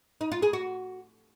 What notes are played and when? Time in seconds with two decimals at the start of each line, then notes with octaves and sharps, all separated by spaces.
0.21 D#4
0.32 F4
0.42 G#4
0.53 F#4